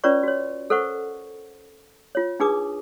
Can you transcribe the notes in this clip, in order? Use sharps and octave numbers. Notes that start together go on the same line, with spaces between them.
C#4 F4 B4 C#5 D5 C#6
F#4 C#5
A4 A#4 C5 F#5 C#6
F4 C#5
D4 D#4 G#4 B4 D6 D#6